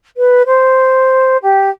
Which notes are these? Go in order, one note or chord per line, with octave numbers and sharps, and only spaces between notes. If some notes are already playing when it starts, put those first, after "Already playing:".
B4
C5
G4